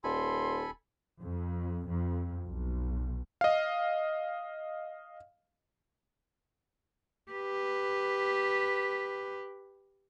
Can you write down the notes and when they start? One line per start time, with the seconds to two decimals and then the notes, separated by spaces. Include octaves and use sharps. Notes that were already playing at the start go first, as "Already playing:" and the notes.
0.04 D#1 A4 G#5 B5 C6
1.20 F2
1.88 F2
2.44 B1
3.41 D#5 F5
7.32 G4 B4